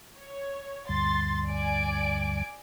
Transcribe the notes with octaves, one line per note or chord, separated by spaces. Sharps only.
C#5
D2 G2 C6 A6
D5 G#5 D7